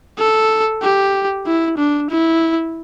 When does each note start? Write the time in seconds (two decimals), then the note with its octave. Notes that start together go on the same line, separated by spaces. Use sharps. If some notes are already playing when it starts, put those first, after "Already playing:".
0.18 A4
0.82 G4
1.46 E4
1.78 D4
2.10 E4